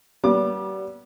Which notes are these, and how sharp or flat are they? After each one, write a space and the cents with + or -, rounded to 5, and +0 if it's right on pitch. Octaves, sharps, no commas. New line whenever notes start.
G3 -35 B3 -25 D6 +20